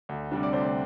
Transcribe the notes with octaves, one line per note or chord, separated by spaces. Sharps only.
D2
C3 G3 D4
D5
D2 C5